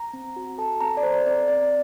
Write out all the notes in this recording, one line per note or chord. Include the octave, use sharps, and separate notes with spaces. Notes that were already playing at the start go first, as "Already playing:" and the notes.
Already playing: A#5
C4
F#4
A4 A5
C4 A#5
D5
A4 C5
C4 D5
C4 D5